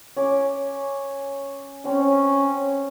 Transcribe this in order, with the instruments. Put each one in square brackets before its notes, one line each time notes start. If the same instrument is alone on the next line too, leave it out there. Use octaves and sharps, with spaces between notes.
[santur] C#4 D6
[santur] C4 [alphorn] C#4